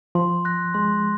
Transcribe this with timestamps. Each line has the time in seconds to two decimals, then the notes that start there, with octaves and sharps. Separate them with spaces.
0.15 F3 C6
0.45 F#6 A#6
0.74 G#3 C6